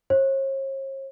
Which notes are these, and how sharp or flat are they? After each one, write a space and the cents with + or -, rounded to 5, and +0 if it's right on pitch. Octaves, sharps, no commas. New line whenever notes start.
C#5 -45